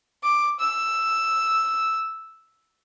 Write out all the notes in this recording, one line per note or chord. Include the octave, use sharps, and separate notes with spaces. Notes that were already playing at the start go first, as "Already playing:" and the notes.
D6
E6